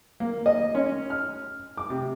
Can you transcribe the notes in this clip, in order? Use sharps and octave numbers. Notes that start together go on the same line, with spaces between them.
A#3
D#5
C#4
F6
D6
C3